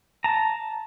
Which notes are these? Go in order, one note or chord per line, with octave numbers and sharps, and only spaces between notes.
A5 A#5